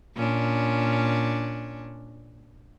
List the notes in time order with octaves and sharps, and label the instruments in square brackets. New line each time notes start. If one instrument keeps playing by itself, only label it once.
[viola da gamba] A#2 C#4 D4